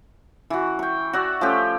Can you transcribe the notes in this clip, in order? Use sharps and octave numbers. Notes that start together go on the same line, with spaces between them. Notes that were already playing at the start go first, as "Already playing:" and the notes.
E3 F#4
G5 C#6
F#4 D5 E5
F3 A3 C#4 G4